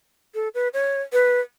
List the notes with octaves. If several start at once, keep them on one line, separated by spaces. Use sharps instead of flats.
A4
B4
C#5
B4